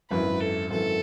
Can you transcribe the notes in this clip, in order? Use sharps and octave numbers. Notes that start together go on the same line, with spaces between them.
G#1 F#2 E3 B4
A4
G#1 F#2 E3 A4